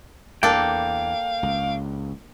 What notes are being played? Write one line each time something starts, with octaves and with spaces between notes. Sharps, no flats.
E2 A#3 D4 A4 F5 G5
C#2